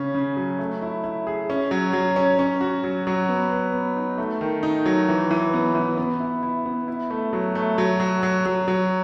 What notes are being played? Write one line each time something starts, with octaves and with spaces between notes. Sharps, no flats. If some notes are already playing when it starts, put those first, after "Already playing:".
Already playing: C#3 C#4
C#3
F#3
A3
E4
E4
G#4
C#4
F#3
F#3
C#4
C#4
F#4
F#3
F#3
B3
B4
B3
D#4
A3
D#3
D#4
F#3
E3
E3
B3
E3
B3
E4
E4
B3
E4
A3
F#3
A3
F#3
F#3
F#3
F#3
F#3